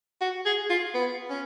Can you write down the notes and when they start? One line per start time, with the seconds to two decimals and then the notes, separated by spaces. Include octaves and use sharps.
0.21 F#4
0.45 G#4
0.69 F4
0.94 B3
1.30 C#4